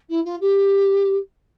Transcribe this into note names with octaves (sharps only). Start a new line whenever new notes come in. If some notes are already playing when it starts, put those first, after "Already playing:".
E4
F4
G4